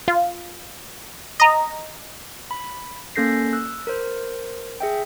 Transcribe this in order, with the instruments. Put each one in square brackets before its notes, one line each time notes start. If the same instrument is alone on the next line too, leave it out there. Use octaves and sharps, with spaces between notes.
[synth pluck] F4
D#5 A#5
[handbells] B5
A#3 C#4 A4 G6 A#6 C7
E6 F#6
A#4 C5
G#4 E5 G5